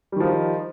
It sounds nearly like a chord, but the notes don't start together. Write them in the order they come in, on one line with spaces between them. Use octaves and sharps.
G3 D#3 F3 D#4